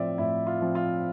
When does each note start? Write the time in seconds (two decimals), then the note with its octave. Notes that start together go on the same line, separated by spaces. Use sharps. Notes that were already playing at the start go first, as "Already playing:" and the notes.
Already playing: A2 F3 C4 D5 E5
0.18 A2 E4
0.47 F4
0.61 F3 C4
0.75 F4